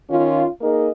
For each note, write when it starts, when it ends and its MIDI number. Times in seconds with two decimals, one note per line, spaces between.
0.10 0.46 51
0.10 0.46 61
0.10 0.46 65
0.61 0.90 58
0.61 0.90 63
0.61 0.90 68
0.61 0.90 70
0.61 0.90 75